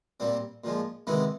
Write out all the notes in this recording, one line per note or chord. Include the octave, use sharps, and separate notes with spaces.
A#2 G3 C4
A#2 F3 G#3
C3 D#3 G#3 B3 E4